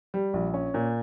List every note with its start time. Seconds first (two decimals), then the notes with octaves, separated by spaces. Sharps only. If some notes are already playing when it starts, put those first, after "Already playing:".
0.14 G3
0.34 A#1
0.54 C#4
0.74 A#2